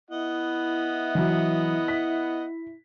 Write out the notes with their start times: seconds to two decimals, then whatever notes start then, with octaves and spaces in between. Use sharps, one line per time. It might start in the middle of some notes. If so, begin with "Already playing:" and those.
0.11 B3 E4 D#5 F#5
1.15 E3 F#3
1.88 B6